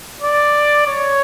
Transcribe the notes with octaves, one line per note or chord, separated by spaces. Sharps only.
D5
C#5